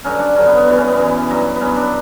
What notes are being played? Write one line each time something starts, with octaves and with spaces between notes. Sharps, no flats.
G2 D3 F#3 C#4
D4
G2 D3 F#3 C#4
B3
B3
F#2 E3 G3 B3
C#4
B3
F#2 E3 G3
G2 F#3
B3
G2 F#3 C#4
D4